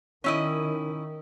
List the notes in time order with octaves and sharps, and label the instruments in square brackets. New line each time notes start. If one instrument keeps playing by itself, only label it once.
[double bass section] D#3 [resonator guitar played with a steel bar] C#4 E4 D#5